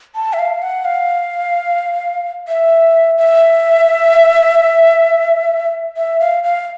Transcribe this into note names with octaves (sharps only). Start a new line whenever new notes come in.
A5
E5
F5
F#5
F5
E5
E5
E5
F5
F5